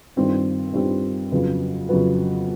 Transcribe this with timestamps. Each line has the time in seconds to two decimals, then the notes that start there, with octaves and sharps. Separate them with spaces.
0.16 G2 D#3 G3 C4 F4
0.73 G2 D#3 G3 C4 F4
1.32 F2 C#3 F#3 B3
1.89 F2 C#3 F#3 B3